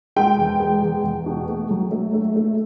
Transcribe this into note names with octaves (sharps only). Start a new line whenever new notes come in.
G#3 G5
E2
G#3
E2
E2
B2
A3
F#3
A3
A3
A3